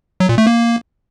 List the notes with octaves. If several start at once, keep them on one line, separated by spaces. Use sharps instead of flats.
F#3
A#2
A3
A#3